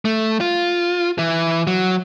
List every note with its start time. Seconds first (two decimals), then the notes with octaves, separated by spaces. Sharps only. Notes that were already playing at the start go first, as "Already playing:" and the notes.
0.05 A3
0.41 F4
1.18 E3
1.67 F#3